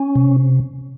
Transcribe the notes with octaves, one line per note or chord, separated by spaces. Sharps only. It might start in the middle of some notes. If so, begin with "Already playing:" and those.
Already playing: C#4
C3